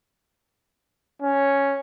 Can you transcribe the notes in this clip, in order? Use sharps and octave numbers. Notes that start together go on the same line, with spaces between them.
C#4